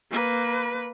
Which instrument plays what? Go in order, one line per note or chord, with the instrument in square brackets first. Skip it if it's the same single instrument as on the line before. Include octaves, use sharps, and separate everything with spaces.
[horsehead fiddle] A#3 B4